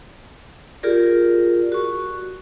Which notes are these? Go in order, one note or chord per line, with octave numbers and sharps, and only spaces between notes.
F4 G4 G#4 A#4 D5
F#4 C#6